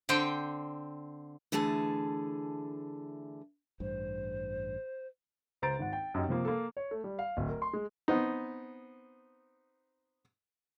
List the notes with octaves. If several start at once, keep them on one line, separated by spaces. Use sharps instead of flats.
D3 C4 C5 G5
D3 E3 A3 G#4 A5
A1 G2 C5
C#2 C5 A#5 A6 D7
G#1 F#5
G5
F#2 D#4 G4
C3 F3 A#3
A#3 A4
C#5
A3
G3
F5
D1
A#4
C6
G#3
B3 C4 D#4